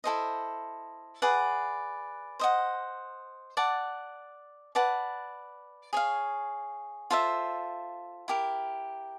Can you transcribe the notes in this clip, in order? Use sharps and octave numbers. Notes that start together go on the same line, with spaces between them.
E4 A4 C5 D#5
G#4 B4 D5 F#5
C5 D#5 F#5
D5 F#5 A5
B4 D5 F#5 A5
G#4 C#5 F5
F4 A4 C5 E5
E4 G4 A#4